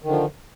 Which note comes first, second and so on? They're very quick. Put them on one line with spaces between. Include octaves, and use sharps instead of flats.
D#3 D3 F3